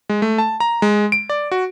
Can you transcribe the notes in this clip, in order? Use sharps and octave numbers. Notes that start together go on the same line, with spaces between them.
G#3
A3
A5
A#5
G#3
D7
D5
F#4